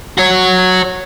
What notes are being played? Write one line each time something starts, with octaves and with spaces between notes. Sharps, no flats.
F#4 C#5